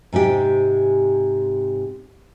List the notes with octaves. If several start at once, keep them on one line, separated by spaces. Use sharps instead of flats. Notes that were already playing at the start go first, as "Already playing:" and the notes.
G#2 C3 G#3 G4